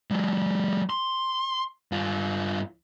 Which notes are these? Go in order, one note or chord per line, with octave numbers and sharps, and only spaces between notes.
F#3 G#3
C6
G2 F4